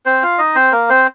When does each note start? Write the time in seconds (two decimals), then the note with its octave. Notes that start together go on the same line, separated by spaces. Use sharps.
0.06 C4 C5
0.23 F4 F5
0.38 D#4 D#5
0.55 C4 C5
0.72 A#3 A#4
0.90 C4 C5